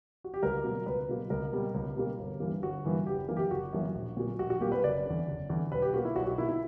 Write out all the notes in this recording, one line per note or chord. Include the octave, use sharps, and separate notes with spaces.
F#4
G4
C#2 A#4
B2 F#3 A#3
C#2 B4
B2 F#3 A#3
C#2 A#4
B2 G3 A#3
C#2
B2 G3 A#3
G1
G2 E3 A#3
G1 F#4
G2 E3 A#3
F#1 G4
F#2 E3 A#3
G4
F#1 F#4
F#2 E3 A#3
A#1
A#2 F#3 A#3
A#1 F#4
F#4
A#2 F#3 A#3 G4
B4
F#1 D5
E2 D3
F#1
E2 D3
B1 B4
G4
B2 A#3 F#4
E4
B1 F#4
F#4
B2 A#3 E4
E4